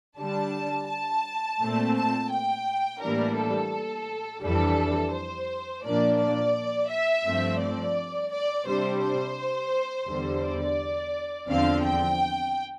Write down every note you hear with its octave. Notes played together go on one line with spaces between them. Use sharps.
D3 G3 D4 A5
A5
A#2 A3 C4
A5
G5
A2 E3 G3 A#3 D4 A#4
A4
F2 E3 G3 D4 A4
C5
A#2 F3 A#3 D4 D5
D5
E5
G2 F3 A3 C4
D5
D5
C3 G3 D4 C5
C5
E2 D3 G3
D5
E2 D3 F3 C4 F5
G5